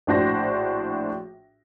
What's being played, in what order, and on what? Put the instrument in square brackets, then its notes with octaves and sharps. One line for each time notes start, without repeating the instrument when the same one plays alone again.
[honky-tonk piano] A#1 A2 D4 F#4 C5 A#6